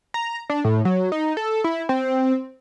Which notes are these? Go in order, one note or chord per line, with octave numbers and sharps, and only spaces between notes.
A#5
D4
A2
F#3
D#4
A4
E4
C4